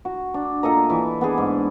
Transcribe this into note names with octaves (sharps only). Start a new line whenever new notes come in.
F#4
D4
A#2 A4 D#5 A#5
E3
B3 D4 G#4
G#2